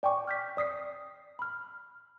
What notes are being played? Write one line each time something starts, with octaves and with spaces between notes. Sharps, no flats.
D5 G5 G#5 C#6 D6
F6 G6 B6
D5 D#6 B6 C7
B5 F6